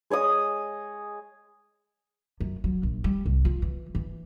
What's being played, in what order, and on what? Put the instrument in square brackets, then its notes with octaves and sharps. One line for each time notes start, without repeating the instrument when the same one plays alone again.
[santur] G#3 C#5 D#5 D#6
[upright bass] F#2
F#3
A#1
G3
C2
F4
E3
E3